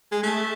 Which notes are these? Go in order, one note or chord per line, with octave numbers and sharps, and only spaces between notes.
G#3
A3